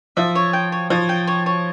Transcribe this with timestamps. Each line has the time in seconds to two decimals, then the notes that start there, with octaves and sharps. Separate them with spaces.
0.17 F3 E5
0.35 C#5
0.53 G5
0.72 C#5
0.90 F3 C#5
1.09 G5
1.27 C#5
1.46 C#5